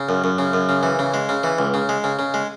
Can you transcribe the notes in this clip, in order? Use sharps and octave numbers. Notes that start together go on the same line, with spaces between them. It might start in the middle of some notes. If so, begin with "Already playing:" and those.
Already playing: C#3
F#2
F#2
C#3
F#2
C#3
E3
C#3
G#3
C#3
E3
C#2
C#3
G#3
C#3
C#3
G#3